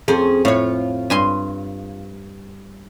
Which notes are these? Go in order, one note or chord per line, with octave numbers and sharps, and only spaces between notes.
F2 C#4 G#4 A4
A2 F4 C#5
G2 G#5 C6